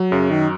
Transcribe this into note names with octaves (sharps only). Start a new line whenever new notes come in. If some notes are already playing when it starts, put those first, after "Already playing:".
Already playing: F#3
F#2 C#3
D#3